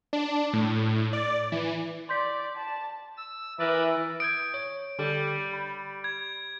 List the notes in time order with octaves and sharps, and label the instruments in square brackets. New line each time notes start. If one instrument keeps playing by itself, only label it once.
[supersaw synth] D4
A2
D5
E3
[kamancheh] D5 [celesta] C6 G6 B6
[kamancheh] A5
[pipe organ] E6
[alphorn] E3 [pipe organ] A#4 B4 D5 [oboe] E5
[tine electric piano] D#6 G6 G#6 [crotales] D7
[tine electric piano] C#5
[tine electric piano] D3 G4 A4 [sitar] G3
[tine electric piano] B5
[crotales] G#6